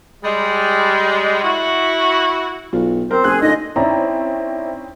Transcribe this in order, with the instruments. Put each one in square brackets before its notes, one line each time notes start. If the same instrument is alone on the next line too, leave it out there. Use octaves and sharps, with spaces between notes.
[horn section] G3 G#3
E4 F#4
[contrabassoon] B1 [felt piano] F4
[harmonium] C4 C5 [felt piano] A#4
[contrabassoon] F#1 [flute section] G#4 [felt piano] F#6
[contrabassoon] D3 [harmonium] A3 C#4 F4 [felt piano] D#4 [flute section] D#5
[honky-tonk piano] C4 C#4 D#4 [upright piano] E4 D5 A#5